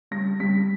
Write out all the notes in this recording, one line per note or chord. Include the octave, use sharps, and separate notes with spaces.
G3 A#6
G3 B6